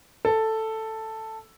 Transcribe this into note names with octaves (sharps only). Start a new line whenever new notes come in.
A4